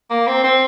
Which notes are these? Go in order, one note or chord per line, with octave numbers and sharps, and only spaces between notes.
A#3
C4
C4